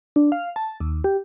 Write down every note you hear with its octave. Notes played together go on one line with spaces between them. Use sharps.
D4
F5
A5
D#2
G4